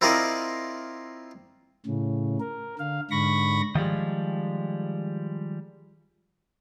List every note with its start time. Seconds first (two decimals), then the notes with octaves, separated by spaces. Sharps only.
0.01 C4 E4 F4 A#4 D5 D#5
1.86 A2 C#3
2.40 A#4
2.79 D3 F5
3.11 G#2 D3 B5 C#6 A#6
3.75 D#3 F3 G3 G#3